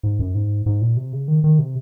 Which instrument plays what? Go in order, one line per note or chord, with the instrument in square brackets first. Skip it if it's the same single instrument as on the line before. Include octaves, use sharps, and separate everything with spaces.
[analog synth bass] G#2
F#2
G#2
G#2
A#2
C3
C#3
D#3
D#3
C3